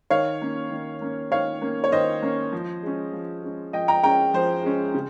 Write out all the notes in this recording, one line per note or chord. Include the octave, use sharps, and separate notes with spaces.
D#3 C#5 F5
A#3 C#4
D#3
A#3 C#4
D#3 C#5 F5
A#3 C#4
C#5
D#3 C5 D#5
A#3 C#4
F3
G#3 C#4
F3
G#3 C#4
F3 D#5 G5
G5 A#5
G#3 C#4 G5 A#5
F3 C5
G#3 C#4
C#3